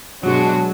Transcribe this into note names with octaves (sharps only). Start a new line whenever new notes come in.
B2 F#3 G#3 D4 F#4